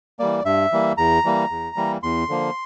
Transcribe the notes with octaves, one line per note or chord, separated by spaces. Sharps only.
E3 G3 A#3 D5
G2 E5
E3 G3 A#3
E2 A#5
E3 G3 A#3
E2
E3 G3 A#3
E2 C6
D3 F3 A#3